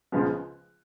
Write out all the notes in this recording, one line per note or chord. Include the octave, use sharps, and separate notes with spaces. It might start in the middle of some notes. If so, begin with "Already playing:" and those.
C#2 C#3 F3 G#3 B3